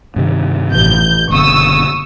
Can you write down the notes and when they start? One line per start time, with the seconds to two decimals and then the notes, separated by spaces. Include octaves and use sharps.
0.16 G2 C3 D#3
0.71 A1 G6
1.30 F#1 B2 D3 C#6 D#6 E6